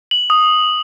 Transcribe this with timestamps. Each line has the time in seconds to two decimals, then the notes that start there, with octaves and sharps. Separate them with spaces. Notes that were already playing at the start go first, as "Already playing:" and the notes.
0.11 F#7
0.30 D#6